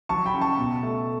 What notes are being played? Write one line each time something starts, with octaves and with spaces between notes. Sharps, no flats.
F#3 A5 C#6
G5 B5
C#3
A5 C#6
B2
A3